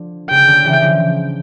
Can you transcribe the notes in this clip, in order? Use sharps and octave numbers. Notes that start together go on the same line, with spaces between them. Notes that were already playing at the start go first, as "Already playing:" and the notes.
Already playing: D3 F3
C#3 G5
D3
C#3 E3
D3 F3